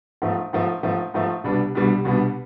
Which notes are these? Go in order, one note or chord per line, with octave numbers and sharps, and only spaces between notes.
G#2 F3 A3
G#2 F3 A3
G#2 F3 A3
G#2 F3 A3
C2 B2 G3 B3 D4
C2 B2 G3 B3 D4
C2 B2 G3 B3 D4